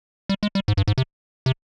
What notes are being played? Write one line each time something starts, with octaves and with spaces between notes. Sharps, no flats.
G3
G#3
G3
G#2
G2
G#2
C3
C3